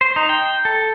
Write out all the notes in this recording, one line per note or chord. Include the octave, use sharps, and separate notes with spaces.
C5
D#4
G5
A4